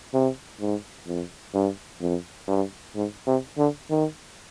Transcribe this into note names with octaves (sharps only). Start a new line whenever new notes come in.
C3
G#2
F2
G2
F2
G2
G#2
C3
D3
D#3